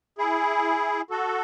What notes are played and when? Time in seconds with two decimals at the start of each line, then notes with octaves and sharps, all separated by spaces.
0.18 E4 G#4
1.10 F#4 A4